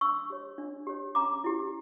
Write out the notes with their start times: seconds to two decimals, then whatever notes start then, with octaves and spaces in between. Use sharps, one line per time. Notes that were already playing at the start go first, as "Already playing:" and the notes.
0.01 D4 C#6 E6
0.30 G4 C#5
0.58 D4
0.87 G4 C#5
1.15 C#4 A#5 D6
1.44 E4 G4